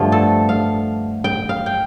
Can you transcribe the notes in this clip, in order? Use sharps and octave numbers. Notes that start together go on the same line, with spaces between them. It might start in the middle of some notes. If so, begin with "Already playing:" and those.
Already playing: G2 D3 F3 A3 F4
A4
F5
G5
F5
G5